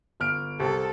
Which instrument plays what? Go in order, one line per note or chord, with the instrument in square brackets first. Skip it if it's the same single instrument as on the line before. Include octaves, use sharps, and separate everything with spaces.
[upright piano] G1 F6 D7
[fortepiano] C2 [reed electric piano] G4 [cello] A4